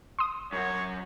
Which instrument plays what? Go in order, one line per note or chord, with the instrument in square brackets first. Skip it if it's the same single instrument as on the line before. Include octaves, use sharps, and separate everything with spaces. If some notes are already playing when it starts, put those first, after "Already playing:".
[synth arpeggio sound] C6 D#6
[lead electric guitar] F#2 F#4 [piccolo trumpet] C#5